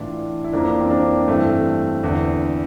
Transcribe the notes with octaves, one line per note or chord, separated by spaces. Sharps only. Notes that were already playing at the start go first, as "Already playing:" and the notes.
Already playing: A2 E3 D4 F4
E4
F2 E3 A#3 D4
C4
A#3 D4
G2 E3 A3 C4
E2 D3